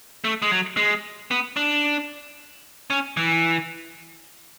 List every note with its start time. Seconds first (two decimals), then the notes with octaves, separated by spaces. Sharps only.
0.24 A3
0.42 G#3
0.51 F#3
0.77 G#3
1.31 B3
1.56 D4
2.90 C#4
3.17 E3